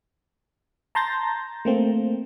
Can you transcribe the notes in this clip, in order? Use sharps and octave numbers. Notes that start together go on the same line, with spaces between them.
A5 A#5 C6 G6 A6 A#6
A3 A#3 C4